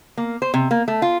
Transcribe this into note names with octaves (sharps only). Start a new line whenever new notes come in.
A#3
C5
C3
A#3
A3
F4